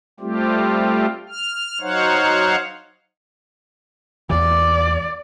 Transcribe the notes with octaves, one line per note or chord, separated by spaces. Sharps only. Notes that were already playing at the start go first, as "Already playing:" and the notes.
G3 A3 C4 F4 G4
F6
F#3 D#4 C5 C#5 F5 F#5
E2 E3 D5